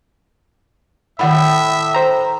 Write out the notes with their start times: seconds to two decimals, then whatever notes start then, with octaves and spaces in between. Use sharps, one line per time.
1.19 A2 D#3 E5 F#5 B5
1.95 C5 A#5